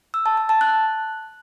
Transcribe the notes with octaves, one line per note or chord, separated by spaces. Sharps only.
E6
A5
A5
A5
F#6